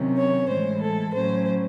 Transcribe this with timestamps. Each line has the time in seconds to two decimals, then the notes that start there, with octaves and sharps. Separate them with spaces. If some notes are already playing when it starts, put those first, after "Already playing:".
Already playing: C3 D#3 F#3 C#4
0.17 C#5
0.48 A2 E3 G#3 C5
0.81 A4
1.13 A2 F#3 C#4 C5